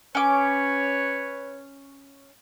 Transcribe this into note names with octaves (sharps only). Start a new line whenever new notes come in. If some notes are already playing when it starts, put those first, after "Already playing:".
C#4 B4 C#5 D6